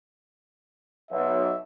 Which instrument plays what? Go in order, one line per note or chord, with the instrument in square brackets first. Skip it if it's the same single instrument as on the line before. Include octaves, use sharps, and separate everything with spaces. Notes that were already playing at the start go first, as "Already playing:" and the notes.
[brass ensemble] B1 [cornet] E5